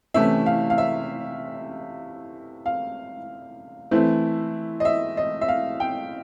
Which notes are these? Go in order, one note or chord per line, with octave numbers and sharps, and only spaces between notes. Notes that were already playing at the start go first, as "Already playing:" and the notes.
C3 E3 A3 C#4 E4 E5
F5
F5
E5
F5
E3 A3 C4 E4
D#5
E5
D#5
E5
F5
G5